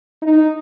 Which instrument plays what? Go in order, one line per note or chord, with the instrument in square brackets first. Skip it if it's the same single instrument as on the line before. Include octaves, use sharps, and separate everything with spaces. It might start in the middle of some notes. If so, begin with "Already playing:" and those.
[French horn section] D#4